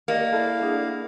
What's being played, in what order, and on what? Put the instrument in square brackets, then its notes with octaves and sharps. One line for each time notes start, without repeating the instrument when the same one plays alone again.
[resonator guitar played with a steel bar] A#3 [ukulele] G4 D5 D#5
[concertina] E4 F5 [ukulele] A4 D5
[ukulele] D4 G#4 F#5